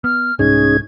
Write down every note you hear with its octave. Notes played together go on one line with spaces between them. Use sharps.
B3 F6
C2 G#2 C#4 D#4 G#4 G#6